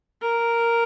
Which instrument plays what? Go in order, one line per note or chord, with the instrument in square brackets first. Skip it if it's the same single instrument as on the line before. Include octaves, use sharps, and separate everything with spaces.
[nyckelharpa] A#4